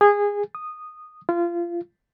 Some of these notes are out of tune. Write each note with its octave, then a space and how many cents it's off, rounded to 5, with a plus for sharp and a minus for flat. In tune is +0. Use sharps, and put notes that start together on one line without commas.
G#4 -20
D#6 -10
F4 -25